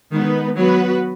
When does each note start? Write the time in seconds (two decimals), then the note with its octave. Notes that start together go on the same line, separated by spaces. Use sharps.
0.11 D#3 G#3 B3 D#4 B4
0.56 F#3 B3 F#4 B4